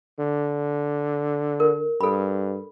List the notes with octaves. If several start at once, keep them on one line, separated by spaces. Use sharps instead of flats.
D3
A#4
G2 A4 B5